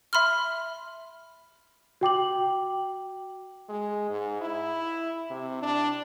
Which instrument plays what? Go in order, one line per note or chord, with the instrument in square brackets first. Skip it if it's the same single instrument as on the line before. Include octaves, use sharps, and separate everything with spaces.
[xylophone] E5 B5 C6 F6
[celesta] F#4 G5 D6 F#7
[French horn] G#3
G#2
E4
C3
D4